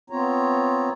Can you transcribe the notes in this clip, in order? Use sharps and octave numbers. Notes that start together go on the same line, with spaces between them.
B3 C4 F4 C#5 A#5